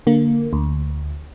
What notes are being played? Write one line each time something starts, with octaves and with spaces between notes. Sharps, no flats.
D3 A#3
D2